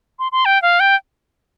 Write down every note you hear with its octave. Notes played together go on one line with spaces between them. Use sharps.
C6
C6
G5
F5
G5